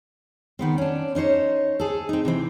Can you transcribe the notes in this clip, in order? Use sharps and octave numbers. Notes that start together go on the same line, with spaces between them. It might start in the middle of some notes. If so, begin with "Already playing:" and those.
D#3 B3 C4
C#4 D4
C#4 D#4 C5 C#5
G#4 A4
C4 D#4
C3 E3 C4